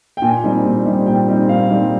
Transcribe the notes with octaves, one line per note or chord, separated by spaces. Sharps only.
G5
A#2 G#5
G3 C4 D#4
A#2
G3 C4 D#4
A#2 G5
G3 C4 D#4
A#2 F5
G3 C4 D#4